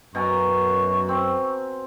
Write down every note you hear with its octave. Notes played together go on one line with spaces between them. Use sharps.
F#2 B2 G#5 A#5 C#6
C4